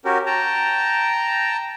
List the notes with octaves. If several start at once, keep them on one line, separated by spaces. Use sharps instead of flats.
C#4 F#4 G4 A#4
G5 A5 A#5